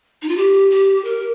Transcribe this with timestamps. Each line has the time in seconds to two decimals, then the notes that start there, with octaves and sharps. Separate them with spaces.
0.22 D#4
0.29 F4
0.37 G4
0.71 G4
1.05 A#4